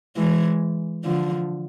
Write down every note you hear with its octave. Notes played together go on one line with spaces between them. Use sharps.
E3 G#3
D3 F3